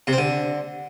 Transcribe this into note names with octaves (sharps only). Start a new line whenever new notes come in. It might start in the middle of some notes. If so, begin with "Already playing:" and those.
C3
C4
D3